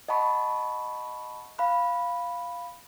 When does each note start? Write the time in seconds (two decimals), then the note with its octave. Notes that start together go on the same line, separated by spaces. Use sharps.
0.08 D#5 F#5 A5 B5 C#6
1.59 F5 B5 F#6